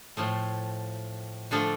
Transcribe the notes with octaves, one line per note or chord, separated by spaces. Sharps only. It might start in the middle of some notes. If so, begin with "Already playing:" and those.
A2 F3 A3
D3 F3 A3 D4 A4